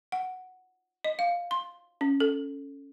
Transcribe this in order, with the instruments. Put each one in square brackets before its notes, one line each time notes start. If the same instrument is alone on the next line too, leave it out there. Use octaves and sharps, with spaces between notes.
[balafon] F#5
D#5
F5
C6
C#4
A4